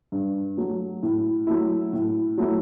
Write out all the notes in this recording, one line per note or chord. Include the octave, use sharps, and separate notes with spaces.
G2
F#3 A3
A2
F#3 A3 E4
A2
F#3 A3 E4